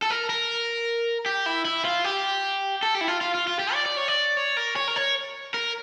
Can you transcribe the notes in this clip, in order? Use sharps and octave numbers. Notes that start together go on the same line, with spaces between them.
A4
A#4
A#4
G4
E4
E4
F4
G4
A4
G4
E4
F4
F4
F4
F4
G4
D5
D5
C#5
D5
C#5
A#4
C#5
A#4
C#5
A#4